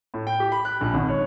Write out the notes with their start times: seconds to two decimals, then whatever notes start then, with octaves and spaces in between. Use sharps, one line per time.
0.14 A2
0.27 G5
0.40 G4
0.52 B5
0.65 F#6
0.81 A#1
0.94 G#1
1.09 C#5